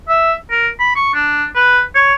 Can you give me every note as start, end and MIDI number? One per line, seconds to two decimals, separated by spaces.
0.09 0.34 76
0.51 0.68 70
0.79 0.95 83
0.96 1.11 85
1.14 1.46 62
1.55 1.81 71
1.95 2.14 73